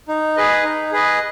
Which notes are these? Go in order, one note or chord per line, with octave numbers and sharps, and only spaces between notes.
D#4
G#4 B4 D#5
D#4
G#4 B4 D#5